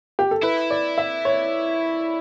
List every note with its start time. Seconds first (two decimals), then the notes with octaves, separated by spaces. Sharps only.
0.19 G4
0.31 A4
0.43 E4 B4
0.70 D5
0.98 E5
1.25 C#5